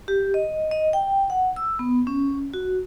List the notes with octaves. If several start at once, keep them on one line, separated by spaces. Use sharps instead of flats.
G4
D#5
D#5
G5
F#5
E6
B3
C#4
F#4